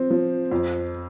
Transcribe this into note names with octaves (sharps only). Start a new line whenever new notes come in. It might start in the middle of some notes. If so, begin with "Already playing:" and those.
Already playing: F3 C4
F3
F2